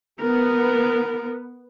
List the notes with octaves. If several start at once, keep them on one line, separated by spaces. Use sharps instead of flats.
B3 A#4